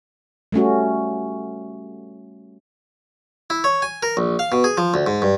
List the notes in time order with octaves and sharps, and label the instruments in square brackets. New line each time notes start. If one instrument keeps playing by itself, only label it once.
[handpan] G3 A3 C#4 F#4
[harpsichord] E4
C#5
G#5
A#4
A#1
F5
B2
G#4
F3
D2
G#2
G2